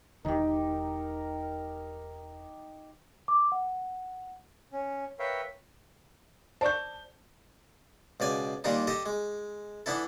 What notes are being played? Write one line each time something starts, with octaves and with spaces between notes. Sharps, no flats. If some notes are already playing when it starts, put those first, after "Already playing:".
E1 D#3 D#4 G4 A#4
D6
F#5
C#4
A#4 B4 C#5 E5 F5 G5
C5 D5 A5 C#6 G6
C#2 B2 D5 G#5
A#2 D#3 G3 D4 D#4
G4 A4 D#5
G#3
E3 B3 D4 E4 A4